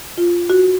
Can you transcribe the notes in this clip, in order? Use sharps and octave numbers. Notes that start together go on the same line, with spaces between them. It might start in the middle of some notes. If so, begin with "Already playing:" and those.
F4
F#4